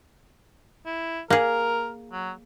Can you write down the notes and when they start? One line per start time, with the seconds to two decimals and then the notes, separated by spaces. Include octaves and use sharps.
0.86 E4
1.30 A#3 G#4 A#4
2.12 F#3